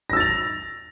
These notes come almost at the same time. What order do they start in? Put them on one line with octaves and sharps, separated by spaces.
A#6 E6 A6 F7